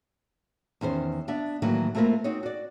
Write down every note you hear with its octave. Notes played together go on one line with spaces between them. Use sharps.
E2 D#3 C#4 C5
B3 D4 D5 E5
A2 D#3 E3 F#3 A#3
A3 A#3 C4 F4 A#4 B4
C4 D#4 F#4 C#5
F#4 D5